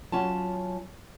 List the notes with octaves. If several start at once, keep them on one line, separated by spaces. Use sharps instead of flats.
F#3 C#4 F4 A5